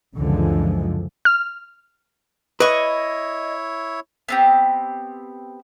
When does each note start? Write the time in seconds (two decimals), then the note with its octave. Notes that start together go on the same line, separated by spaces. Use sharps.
0.16 C#2 F#2 D3 E3 F3 G#3
1.25 F6
2.60 E4 B4 C#5 D#5 C#6
4.28 B3 C4 G4